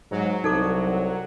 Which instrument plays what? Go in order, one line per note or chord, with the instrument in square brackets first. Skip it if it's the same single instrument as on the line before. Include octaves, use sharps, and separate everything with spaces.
[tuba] G#2 [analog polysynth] F#3
[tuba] C2 [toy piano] D#4 A4 D6